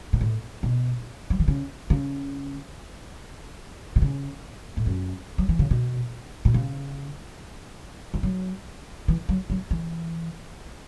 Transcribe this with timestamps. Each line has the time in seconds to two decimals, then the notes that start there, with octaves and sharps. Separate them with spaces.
0.13 B2
0.21 A2
0.63 B2
1.30 F#3
1.40 E3
1.48 C#3
1.90 C#3
3.96 B2
4.02 C#3
4.77 A2
4.86 F#2
5.38 F#3
5.49 E3
5.59 C#3
5.71 B2
6.45 B2
6.54 C#3
8.14 E3
8.23 F#3
9.08 E3
9.29 F#3
9.50 F#3
9.71 E3